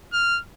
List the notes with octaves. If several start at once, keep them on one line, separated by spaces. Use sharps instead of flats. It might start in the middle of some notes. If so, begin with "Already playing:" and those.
F6